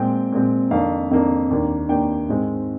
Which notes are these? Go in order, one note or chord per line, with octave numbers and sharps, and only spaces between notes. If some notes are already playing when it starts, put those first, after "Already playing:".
Already playing: A#2 G#3 C4 G5
A#2 G#3 C4
F2 D#3 A#3 D4 F5
F2 D#3 A#3 D4
D#2 D#3 A#3 D4
D#2 D#3 A#3 D4 G5
G#2 D#3 G#3 C4